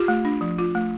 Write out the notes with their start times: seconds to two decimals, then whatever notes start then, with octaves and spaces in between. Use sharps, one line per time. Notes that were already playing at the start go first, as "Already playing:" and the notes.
Already playing: F4 G4
0.08 A3
0.25 D4
0.41 F3
0.58 F4
0.75 A3